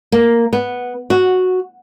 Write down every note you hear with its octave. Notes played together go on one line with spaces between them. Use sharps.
A#3
B3
F#4